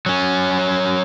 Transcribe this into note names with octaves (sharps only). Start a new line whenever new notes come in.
F#3 C#4